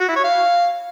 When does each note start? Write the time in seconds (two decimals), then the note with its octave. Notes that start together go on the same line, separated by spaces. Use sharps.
0.01 F#4
0.08 E4
0.16 C#5
0.24 F5